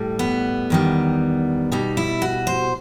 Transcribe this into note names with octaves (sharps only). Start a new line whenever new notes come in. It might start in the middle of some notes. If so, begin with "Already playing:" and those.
Already playing: A2 G3
B3
E2 D#3 G3
B2 G3 D#4
E4
F#4
C5